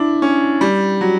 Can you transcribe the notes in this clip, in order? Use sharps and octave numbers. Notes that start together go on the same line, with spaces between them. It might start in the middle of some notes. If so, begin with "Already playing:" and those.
Already playing: D4 E4
C#4
G3
F#3